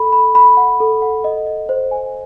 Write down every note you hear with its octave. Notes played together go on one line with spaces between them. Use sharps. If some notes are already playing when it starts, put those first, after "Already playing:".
Already playing: A4 B5
B5
B5
F#5
A4
F#5
D#5
D#5
C5
G#5